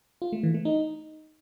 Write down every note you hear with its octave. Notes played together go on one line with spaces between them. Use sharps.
F4
A3
E3
A3
D#4